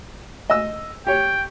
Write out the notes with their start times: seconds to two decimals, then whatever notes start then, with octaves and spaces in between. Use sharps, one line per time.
0.50 D#5 E6
1.07 G4 C#5 G5